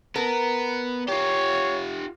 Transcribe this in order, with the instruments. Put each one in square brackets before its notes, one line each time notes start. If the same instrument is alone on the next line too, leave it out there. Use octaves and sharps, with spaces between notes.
[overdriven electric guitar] B3 [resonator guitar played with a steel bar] A#4
[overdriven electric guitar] F4 G4 [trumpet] C#5